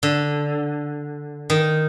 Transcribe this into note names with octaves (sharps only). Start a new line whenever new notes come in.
D3
D#3